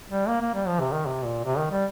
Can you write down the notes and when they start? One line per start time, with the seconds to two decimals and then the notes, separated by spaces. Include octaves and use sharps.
0.09 G3
0.28 A#3
0.41 A#3
0.54 G3
0.67 F3
0.80 C3
0.93 D#3
1.06 C3
1.25 A#2
1.45 C3
1.58 D#3
1.71 G3